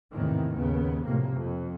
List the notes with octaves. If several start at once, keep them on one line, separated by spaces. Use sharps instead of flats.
G#1 E2 A2 C3 D#3 E3
D#2 C#3 B3
F1 B1 A2 C3 A#3
F2